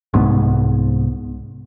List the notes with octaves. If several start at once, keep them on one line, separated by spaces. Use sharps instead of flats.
C2 G#2 B3